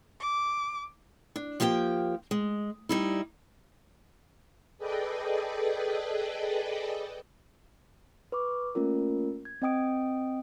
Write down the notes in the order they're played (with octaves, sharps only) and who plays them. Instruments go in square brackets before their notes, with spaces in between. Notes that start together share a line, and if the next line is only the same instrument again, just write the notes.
[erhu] D6
[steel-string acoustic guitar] D4
F3 A#3 G4 E5 G5
G#3
G3 D#4 E4
[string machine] G#4 A4 B4 D5 D#5 G5
[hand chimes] B4 C#6 D6
A3 A#3 C#4 F4 A#4
G#6
C4 D#5 G5 D#6 D7